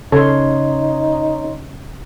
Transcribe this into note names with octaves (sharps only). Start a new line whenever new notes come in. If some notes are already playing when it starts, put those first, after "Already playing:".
C#3 D#4 A4 C#5 C6